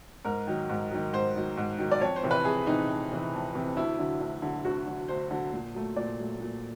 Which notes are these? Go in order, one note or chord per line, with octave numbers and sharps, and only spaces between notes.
G#2 A#4
D#3 F#3
G#2
D#3 F#3
G#2 C5
D#3 F#3
G#2
D#3 F#3
D5
F2 C#5
C5
C3 E3
B4
F2 G#4
C3 E3 D#4
F2
C3 E3
F2
C3 E3
D2 E4
D3 F#3
D2
D3 F#3
D2 F#4
D3 F#3
D2 C5
D3 F#3
A#2
F#3 A3
A#2 D5
F#3 A3
A#2